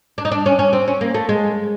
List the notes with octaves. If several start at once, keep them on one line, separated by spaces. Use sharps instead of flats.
D4
D#4
D4
C#4
C#4
C4
C#4
A#3
A3
G#3